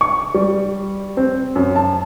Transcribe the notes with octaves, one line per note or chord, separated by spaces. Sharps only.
C#6
G3
C4
F#2
A5